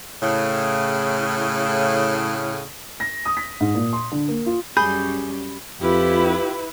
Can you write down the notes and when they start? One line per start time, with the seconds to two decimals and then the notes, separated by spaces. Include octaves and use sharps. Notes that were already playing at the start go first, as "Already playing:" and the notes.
0.23 A2 C#3
3.00 A#6
3.25 D#6
3.37 B6
3.60 G#2
3.75 A#2
3.93 C6
4.12 D3
4.28 A#3
4.46 F4
4.77 F#2 G3 C#4 G#4 B5 G6
5.81 F2 E4 F4 G4 B4